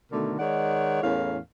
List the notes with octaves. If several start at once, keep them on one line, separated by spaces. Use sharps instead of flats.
B2 D3 D#3 A3 A#4
D#3 G#3 C#5 D5 F#5
E2 A2 C#4 A#4 F5